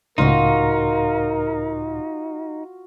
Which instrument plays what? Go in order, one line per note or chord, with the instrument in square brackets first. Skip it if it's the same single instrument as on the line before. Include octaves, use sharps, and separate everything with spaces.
[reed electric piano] C#2 A2 [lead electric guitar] D#4 [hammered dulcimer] F4 F#4 [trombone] A#4